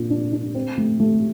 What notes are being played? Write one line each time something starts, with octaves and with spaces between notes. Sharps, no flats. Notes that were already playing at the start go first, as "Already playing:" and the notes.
Already playing: A#2 D4
D4
D4
C4
A3
A3